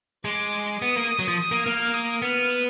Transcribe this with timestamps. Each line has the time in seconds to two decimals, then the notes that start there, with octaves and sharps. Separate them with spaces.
0.25 G#3 D6
0.81 B3 D#6
0.96 A#3
1.19 F#3
1.28 F3
1.38 D#6
1.51 A#3
1.66 A#3 F6
1.94 D#6
2.22 B3 F6